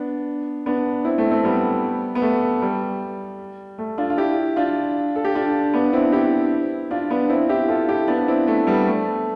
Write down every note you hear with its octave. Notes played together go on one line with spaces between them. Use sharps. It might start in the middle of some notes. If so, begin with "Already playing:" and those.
Already playing: B3 D4
B3 D4
C4 E4
A3 C4
A3 C4
G3 B3
B3
A3
G3
A3
D4 F4
F4
E4 G4
D4 F4
A4
G4
D4 F4
B3 D4
C4 E4
E4 G4
D4 F4
B3 D4
C4 E4
E4 G4
F4 A4
E4 G4
B3 D4
C4 E4
A3
G3 B3
A3